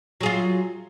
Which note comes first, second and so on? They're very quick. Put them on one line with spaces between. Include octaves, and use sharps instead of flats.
F#3 G#4 F4